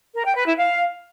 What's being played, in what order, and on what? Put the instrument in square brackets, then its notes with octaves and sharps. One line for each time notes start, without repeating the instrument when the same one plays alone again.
[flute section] A#4
G5
B4
E4
F5